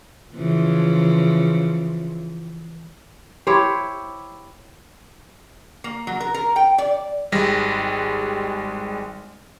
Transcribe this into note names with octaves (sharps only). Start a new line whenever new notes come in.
C#3 E3 F3
E4 G4 C5 C#5
A#3
F#3
A#4
A#4
G5
D5
G#1 G3 G#3 A#6